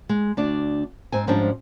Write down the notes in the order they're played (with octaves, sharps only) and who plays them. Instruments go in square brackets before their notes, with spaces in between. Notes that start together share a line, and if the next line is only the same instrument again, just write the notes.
[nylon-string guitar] G#3
D2 D4 D5
G#2 C4 G#5
G#2 F3 G3 C#4 D4